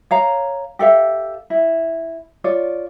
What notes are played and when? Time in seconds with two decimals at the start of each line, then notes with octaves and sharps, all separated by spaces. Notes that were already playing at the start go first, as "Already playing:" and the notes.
0.11 C#5 F5 A#5
0.79 G4 A4 E5 F5
1.50 E4
2.44 F4 C#5 D5